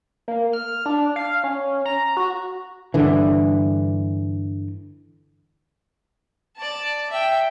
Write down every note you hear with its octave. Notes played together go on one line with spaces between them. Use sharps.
A#3
F6
D4
F5
C#4
A#5
F#4
G2 D3 E3
D5 A5
E5 G5